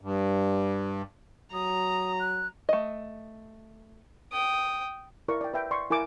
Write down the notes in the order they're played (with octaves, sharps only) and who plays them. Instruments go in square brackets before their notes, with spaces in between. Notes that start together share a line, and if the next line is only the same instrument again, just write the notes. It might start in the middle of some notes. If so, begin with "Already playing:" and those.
[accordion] G2
[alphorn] F#3 [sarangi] A#5 [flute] D#6
[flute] F#6
[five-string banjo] A3 D#5
[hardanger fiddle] G5 D#6
[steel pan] E4 A#4 D5 C#6
D5 G5
B4 E5 G5
D5 C6 C#6
E4 A#4 G#5 D6